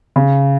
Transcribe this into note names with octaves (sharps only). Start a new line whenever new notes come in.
C#3